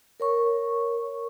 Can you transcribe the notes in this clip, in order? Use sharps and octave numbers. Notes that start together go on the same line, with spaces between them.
A#4 C#5 C#6